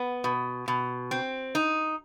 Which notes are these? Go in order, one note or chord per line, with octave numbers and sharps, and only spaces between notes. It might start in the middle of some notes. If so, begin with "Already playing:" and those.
Already playing: B3
B2
B2
C4
D#4